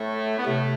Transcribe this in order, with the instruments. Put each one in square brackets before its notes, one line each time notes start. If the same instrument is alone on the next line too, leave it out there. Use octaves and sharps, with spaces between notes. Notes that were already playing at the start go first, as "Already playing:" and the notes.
Already playing: [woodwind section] A2 A3
B3
[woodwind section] A2 A3 [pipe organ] C3